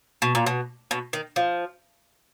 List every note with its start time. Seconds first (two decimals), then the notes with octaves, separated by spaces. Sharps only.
0.22 B2
0.35 A#2
0.46 B2
0.91 B2
1.13 D#3
1.36 F3